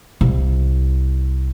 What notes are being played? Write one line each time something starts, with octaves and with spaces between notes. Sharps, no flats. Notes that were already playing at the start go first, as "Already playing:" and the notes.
C2